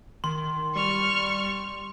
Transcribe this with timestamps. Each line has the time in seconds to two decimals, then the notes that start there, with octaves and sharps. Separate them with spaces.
0.24 D#3 C6
0.76 G3 C#6 F6